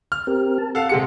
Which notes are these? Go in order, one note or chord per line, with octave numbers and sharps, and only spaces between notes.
F6
C4 G4 A#4
A5
A4 F5 F#5
C3 G#3 C#7